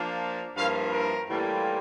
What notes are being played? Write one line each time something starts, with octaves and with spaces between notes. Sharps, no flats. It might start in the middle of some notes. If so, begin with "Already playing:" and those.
Already playing: F3 A#3 D4 F4
G2 F3 A#3 E4 F5
A#4
A2 E3 G3 A#3 F4